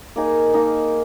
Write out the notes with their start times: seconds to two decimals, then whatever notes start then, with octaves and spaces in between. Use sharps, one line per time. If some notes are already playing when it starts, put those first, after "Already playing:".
0.16 A#3 D#4 G#4
0.54 A#3 D#4 G#4